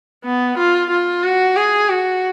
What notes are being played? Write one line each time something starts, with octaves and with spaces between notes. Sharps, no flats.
B3
F4
F4
F#4
G#4
F#4